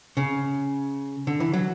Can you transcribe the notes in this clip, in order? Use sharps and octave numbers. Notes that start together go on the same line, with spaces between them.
C#3
D3
E3
F#3